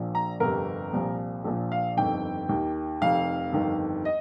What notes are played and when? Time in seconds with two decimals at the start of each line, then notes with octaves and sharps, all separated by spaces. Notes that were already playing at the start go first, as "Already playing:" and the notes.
Already playing: A#1 A#2 F3
0.15 A#5
0.40 G1 F2 C3 A#4
0.93 C2 A#2 F3
1.45 A#1 A#2 F3
1.72 F5
1.97 G1 F2 D#3 G5
2.49 D#2 D#3
3.02 F1 F2 D#3 F5
3.53 G1 F2 D#3
4.05 D#5